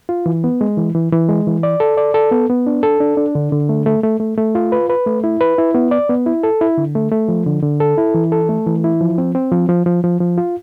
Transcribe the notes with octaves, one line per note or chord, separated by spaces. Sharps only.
F4
E3
B3
G#3
E3
E3
E3
G#3
E3
D5
A4
D5
A4
B3
B3
D4
A4
D4
D4
D3
D3
A3
A3
A3
A3
A3
F4
B4
B4
A3
E4
B4
E4
B3
D5
B3
E4
A4
E4
D3
A3
A3
F3
D3
D3
A4
E4
E3
A4
A3
E3
E4
F3
C4
C4
F3
F3
F3
F3
F3
F4